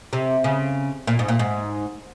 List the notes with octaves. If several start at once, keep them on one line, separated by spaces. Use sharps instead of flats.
C3
C#3
A#2
G#2
A#2
G#2